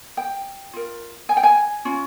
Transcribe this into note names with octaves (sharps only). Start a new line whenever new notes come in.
G5
F4 A#4
G#5
G5
G#5
C#4 F4